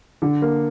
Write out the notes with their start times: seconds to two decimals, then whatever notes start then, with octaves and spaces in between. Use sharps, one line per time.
0.22 D3
0.42 A#3